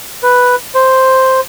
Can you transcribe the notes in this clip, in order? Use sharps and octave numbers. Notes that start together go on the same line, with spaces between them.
B4
C5